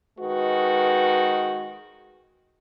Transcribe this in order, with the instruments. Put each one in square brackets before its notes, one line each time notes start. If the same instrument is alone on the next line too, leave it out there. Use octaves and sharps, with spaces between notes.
[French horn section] D#3 G#3 F#4 B4